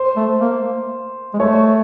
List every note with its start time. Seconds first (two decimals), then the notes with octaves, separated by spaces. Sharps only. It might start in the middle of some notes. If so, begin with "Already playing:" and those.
Already playing: C5
0.16 A3
0.41 A#3
1.34 G#3
1.39 A3 C#5